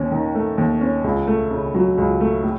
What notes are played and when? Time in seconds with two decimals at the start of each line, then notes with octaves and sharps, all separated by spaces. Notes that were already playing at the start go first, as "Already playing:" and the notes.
Already playing: D#2 C#4
0.12 D#3
0.35 A3
0.58 D#2
0.81 C#4
1.04 C#2
1.27 A3
1.51 C#3
1.74 F#3
1.98 C#2
2.21 A3
2.44 A2